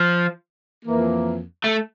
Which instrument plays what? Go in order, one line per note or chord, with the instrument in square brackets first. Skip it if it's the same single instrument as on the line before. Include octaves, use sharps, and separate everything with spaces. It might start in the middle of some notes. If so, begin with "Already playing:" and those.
Already playing: [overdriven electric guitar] F3
[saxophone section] F2 E3 A#3
[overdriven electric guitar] A3